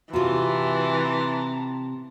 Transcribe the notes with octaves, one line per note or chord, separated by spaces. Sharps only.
C3 E3 F4 F#4 A5 A#5 C6